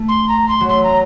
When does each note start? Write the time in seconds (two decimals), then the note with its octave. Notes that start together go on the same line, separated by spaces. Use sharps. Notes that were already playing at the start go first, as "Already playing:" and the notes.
Already playing: A3
0.08 C6
0.28 A#5
0.48 C6
0.61 F#3
0.69 A3 C6
0.84 A#5